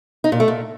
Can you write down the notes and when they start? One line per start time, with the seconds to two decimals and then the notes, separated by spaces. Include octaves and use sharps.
0.24 D#4
0.32 A#2
0.40 A3
0.48 A#2